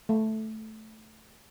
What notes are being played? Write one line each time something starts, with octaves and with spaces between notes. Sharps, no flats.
A3